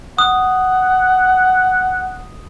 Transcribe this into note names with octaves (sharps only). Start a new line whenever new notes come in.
F#5 D#6